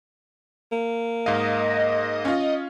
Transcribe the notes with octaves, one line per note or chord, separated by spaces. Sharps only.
A#3
G#2 D#5 F5
C#4 F4